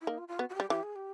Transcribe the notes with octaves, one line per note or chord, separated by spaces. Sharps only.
E4
A#3 D#4
F4
F4
B3 F#4
F#4
G4
G3
E3 G4
G#4
G4